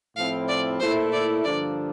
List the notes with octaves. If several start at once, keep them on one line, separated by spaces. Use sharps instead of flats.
A2 F3 C4 E4 F5
D5
A#2 A3 E4 C5
D5
G2 D3 F3 A#3 D4 D5